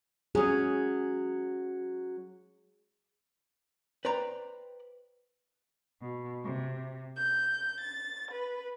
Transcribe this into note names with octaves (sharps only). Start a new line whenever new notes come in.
F#3 C#4 G#4
B4 C5 D5 G5 A#5 B5
B2
C3
G6
A6
B4